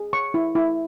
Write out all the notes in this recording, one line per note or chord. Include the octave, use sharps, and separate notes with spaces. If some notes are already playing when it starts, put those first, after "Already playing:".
Already playing: G#4
C#5 C#6
E4
E4